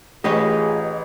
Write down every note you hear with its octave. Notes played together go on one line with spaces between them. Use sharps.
A1 F4 G4 G#4 B4 C#5 D#5